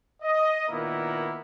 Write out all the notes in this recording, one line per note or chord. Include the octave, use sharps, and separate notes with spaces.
D#5
A#2 D#3 A#3 B3 E4 A#4